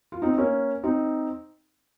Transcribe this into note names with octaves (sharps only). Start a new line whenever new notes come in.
F4
C4 D#4
A#3 C#4
C4 D#4